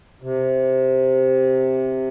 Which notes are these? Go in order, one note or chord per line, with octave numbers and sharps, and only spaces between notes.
C3